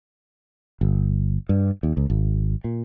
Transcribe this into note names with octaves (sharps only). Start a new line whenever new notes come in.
G1
G2
D#2
C#2
G#1
A#2